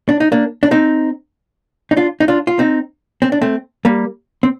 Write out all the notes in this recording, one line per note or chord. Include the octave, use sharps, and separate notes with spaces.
D4
D#4
A#3 D4
D4
C4 D#4
D#4
D4 F4
D#4
D4 F4
F4
C4 D#4
C4
D4
A3 C4
G3 A#3
C4